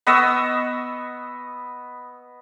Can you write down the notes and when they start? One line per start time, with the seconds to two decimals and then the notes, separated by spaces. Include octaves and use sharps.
0.07 B3 D#5 C#6 E6